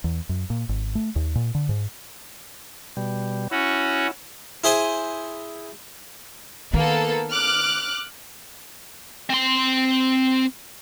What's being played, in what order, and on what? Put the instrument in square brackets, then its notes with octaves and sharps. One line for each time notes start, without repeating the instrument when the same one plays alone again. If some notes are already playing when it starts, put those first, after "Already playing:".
[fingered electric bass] E2
F#2
A#2
G#1
A3
D#2
A#2
D3
G#2
[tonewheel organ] B2 G3
[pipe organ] C#4 F#4 [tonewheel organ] E4
[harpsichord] E4 G#4 C5 G#5
[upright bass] D#3 [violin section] A#3 B3 A4
[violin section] D6 F6 F#6
[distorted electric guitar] C4 C6